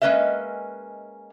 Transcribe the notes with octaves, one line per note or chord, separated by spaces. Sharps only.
G#3 A#3 C#4 B4 D#5 E5